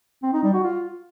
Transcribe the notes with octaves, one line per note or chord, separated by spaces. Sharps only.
C4
D#4
G3
F#4
F4